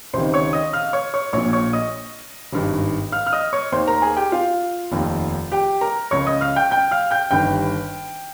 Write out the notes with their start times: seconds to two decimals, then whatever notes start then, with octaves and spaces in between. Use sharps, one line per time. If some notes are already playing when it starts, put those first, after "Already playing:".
0.13 C#2 C3 D#3 C5 C6
0.34 C#5 C#6
0.53 D#5 D#6
0.73 F5 F6
0.93 C#5 C#6
1.14 C#5 C#6
1.33 A#1 A#2 C#5 C#6
1.53 C#5 C#6
1.73 D#5 D#6
2.53 G#1 G2 D#3
3.12 F5 F6
3.27 F6
3.33 D#5 D#6
3.53 C#5 C#6
3.72 D#2 D#3 C5 C6
3.87 A#4 A#5
4.02 G#4 G#5
4.17 G4 G5
4.32 F4 F5
4.91 F1 D#2 D#3
5.52 G4 G5
5.81 A#4 A#5
6.11 C#2 C#3 C#5 C#6
6.26 D#5 D#6
6.41 F5 F6
6.56 G5 G6
6.71 G5 G6
6.91 F5 F6
7.11 G5 G6
7.31 G1 G2 D#3 G5 G6